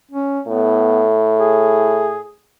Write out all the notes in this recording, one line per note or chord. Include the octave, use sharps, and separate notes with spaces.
C#4
A2 B3
G#4